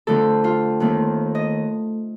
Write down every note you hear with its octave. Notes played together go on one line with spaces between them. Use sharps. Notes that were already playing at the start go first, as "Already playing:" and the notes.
F2 D3 F3 A3 C4 A4
F4
D#2 D#3 A3 C4
D#5